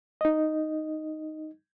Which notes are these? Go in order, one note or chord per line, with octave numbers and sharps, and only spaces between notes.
D#4 D#5